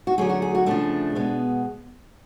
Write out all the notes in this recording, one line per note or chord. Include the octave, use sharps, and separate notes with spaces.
F#4
D3 F#3 A3 G#4
F#4
G#4
F#4
C#3 F3 A3 D4
B2 G#3 B3